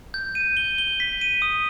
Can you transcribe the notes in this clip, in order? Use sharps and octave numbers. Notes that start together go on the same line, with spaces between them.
G6
D#7
G7
G7
B6
D#7
D#6